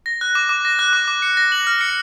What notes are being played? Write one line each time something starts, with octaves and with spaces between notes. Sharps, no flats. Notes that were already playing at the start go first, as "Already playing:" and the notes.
A#6
F#6
D6
D6
A#6
F#6
D6
D6
C#7
A#6
F#7
F6
C#7